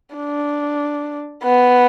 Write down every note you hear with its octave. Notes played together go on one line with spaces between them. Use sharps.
D4
B3